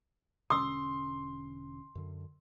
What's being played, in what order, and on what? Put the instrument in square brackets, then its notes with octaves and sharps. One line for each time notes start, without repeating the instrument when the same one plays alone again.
[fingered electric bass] E1 D3 C#4 [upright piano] C6 [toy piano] D#6 E6
[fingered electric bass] F#2 D3